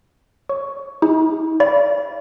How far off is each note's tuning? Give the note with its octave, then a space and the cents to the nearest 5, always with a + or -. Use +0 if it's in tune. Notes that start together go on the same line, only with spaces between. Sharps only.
C#5 +0 C#6 +15
D#4 +45 G#4 -35
D5 -30 F5 -40 B5 +0